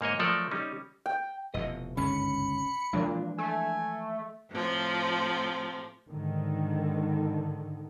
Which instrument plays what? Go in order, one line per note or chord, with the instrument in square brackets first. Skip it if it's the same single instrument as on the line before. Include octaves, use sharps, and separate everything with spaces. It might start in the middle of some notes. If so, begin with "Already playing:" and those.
[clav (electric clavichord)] G#2 A#3 C#5 D#5
F3 F#3 A3 A4 A#4 D5
G3 C#4 D#4
[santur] G5
[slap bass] F1 E2 B2 [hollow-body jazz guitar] D#5
[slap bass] G1 C#2 G#2 [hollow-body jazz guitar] C#4 [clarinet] B5 [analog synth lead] C#7
[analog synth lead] A#2 [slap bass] E3 F3 G#3 [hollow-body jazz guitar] D4
[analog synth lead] A3 [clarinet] G#5
[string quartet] A2 C3 F3
[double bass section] G#2 D3 D#3